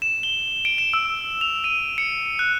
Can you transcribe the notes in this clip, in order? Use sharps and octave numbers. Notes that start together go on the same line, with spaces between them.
E7
G7
D7
E7
E6
F7
D#7
C#7
F#6